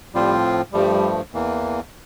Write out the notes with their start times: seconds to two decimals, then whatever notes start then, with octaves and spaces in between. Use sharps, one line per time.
0.15 A2 F3 G3 C4 F4
0.73 G2 F3 G3 A3
1.33 E2 E3 A#3